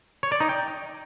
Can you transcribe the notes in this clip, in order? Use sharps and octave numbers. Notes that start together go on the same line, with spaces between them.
C#5
D5
D#4
G5